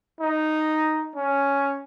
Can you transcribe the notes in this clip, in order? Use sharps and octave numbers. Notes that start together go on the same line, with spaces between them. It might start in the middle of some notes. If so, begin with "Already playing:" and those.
D#4
C#4